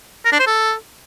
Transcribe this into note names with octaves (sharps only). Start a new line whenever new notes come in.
A#4
D4
C5
A4